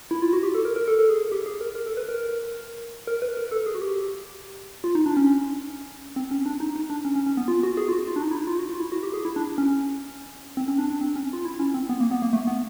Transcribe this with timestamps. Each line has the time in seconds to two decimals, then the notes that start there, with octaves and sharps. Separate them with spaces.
0.11 E4
0.22 F4
0.33 F#4
0.43 G4
0.55 A4
0.65 A#4
0.76 A#4
0.88 A4
0.99 A4
1.09 G#4
1.32 G4
1.46 G#4
1.61 A#4
1.75 A#4
1.86 A4
1.97 B4
2.09 A#4
3.07 A#4
3.22 B4
3.37 A#4
3.51 A4
3.66 G#4
3.75 F#4
3.81 G4
4.84 F4
4.95 D#4
5.06 D4
5.17 C#4
6.16 C4
6.31 C#4
6.46 D4
6.60 D#4
6.76 D#4
6.90 D4
7.05 C#4
7.15 C#4
7.26 C#4
7.37 B3
7.48 F4
7.63 F#4
7.77 G#4
7.88 F4
7.92 F#4
8.07 F4
8.16 D4
8.22 D#4
8.31 E4
8.37 D#4
8.47 F4
8.59 F#4
8.69 F4
8.80 E4
8.92 F#4
9.03 G4
9.14 G#4
9.25 E4
9.36 D4
9.58 C#4
10.57 C4
10.68 C#4
10.79 D4
10.90 D4
11.01 C4
11.16 C#4
11.33 F4
11.45 E4
11.60 C#4
11.74 C4
11.89 B3
12.00 A#3
12.11 B3
12.22 A#3
12.33 A3
12.47 B3